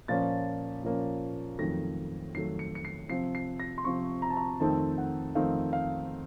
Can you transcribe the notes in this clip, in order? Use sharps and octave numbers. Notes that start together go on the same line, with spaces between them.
A#2 F3 A#3 C#4 A6
A#2 F3 A#3 C#4
F2 D#3 F#3 A3 A#6
F2 D#3 F#3 A3 C7
C#7
C#7
C7
C3 F3 C4 C7
C7
A#6
C6
C3 F3 C4 C#6
A#5
A5
A#5
F2 D#3 A3 C4 D#4 A5
F#5
F2 D#3 A3 C4 D#4 F5
F5